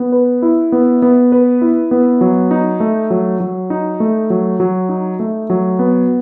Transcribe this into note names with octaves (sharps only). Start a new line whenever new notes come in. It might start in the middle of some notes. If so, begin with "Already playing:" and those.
Already playing: B3
B4
E4
B3
B3
B4
E4
B3
F#3
D#4
A3
F#3
F#3
D#4
A3
F#3
F#3
D#4
A3
F#3
B3